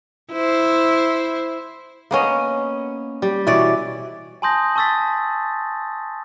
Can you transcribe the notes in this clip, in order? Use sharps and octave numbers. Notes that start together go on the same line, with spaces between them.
E4 C5
A#3 B3 C#4 D#5
G3
B2 E3 C#5 D5
G#5 A5 C6 D#6 G6 A#6
A5 C#6 E6 A6 B6